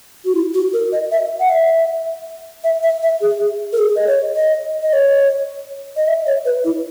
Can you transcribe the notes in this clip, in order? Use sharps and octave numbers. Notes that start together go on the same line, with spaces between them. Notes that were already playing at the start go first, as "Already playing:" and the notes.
F#4
E4
F#4
A#4
D#5
E5
F#5
E5
E5
E5
E5
G#4
A#4
G#4
D#5
C#5
D#5
D#5
C#5
D#5
E5
C#5
B4
E4